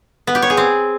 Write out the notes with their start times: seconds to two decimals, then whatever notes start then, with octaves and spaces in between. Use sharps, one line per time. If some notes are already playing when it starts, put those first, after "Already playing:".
0.27 B3
0.35 G4
0.42 C#5
0.50 G#4
0.57 C4